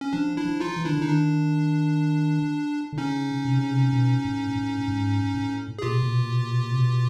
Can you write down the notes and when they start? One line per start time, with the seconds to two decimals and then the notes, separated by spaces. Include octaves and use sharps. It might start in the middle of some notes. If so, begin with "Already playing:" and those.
0.01 C#4
0.13 F3 D4
0.37 D4 E4
0.45 F3
0.60 D#4 F4
0.76 E3
0.84 D#3 D4 E4
0.93 D3
1.03 D#3 D#4
1.09 D4
2.92 D3
2.98 C#3 C#4 D#4
3.45 C3
3.58 C#3
3.71 C3
3.92 B2
4.25 A2
4.55 A2
4.88 G#2
5.34 A2
5.79 G#4
5.82 A#2 F4 G4
5.91 B2
6.02 A#2
6.12 B2
6.21 A#2
6.31 B2
6.41 A#2
6.51 B2
6.61 A#2
6.71 C3
6.77 B2